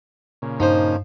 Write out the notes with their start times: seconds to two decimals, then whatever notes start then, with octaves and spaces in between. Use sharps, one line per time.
0.42 A#2 C#3
0.60 G2 F3 D4 D#4 C5